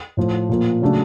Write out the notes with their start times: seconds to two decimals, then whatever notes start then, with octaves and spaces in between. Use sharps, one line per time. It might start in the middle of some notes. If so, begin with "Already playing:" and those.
0.17 A2 F3 A3
0.49 A#2 F3 A#3
0.82 C#3 F#3 A3 D4